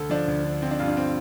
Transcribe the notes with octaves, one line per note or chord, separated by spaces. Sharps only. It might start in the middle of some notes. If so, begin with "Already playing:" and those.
Already playing: D2 A4
F3 D4
D2
D3
F3 C4
D4
G2 F4
D4
C4